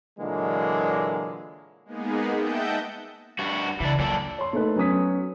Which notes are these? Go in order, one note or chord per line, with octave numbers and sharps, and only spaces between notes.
A#2 D3 E3 F#3 G#3 A#3
G#3 A#3 B3 D#4 G#4
D#5 E5 F#5 G5 A5 G6
G2 F#4
C#3 E3 D4
A#2 F#3 D4 A4
C#5 C6
A3 A#3 D#4 A4 B4
F#3 B3 C#4 D#6 B6